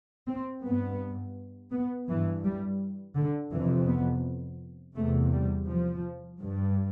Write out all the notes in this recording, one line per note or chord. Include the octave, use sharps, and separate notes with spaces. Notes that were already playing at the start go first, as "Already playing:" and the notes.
C4
G2 B3
B3
G2 E3
G3
D3
F2 C3 E3
B3
E2 C3 A3
G3
F3
G2